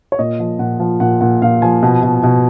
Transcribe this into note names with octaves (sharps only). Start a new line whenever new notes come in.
C#5
A#2 D#5
F3
A#2 F#5
F3
A#2 F#5
A#2 F#5
A#2 F5
F3 G#5
B2
B2
B2